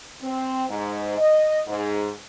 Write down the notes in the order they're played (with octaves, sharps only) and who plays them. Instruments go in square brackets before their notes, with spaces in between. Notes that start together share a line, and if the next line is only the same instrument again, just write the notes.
[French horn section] C4
G#2
D#5
G#2